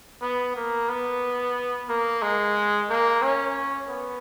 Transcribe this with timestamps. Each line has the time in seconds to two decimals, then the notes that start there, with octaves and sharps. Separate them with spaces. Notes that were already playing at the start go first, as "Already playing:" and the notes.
0.22 B3
0.56 A#3
0.89 B3
1.89 A#3
2.22 G#3
2.89 A#3
3.22 C#4
3.89 B3